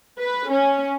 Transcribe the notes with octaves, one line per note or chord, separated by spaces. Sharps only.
B4
C#4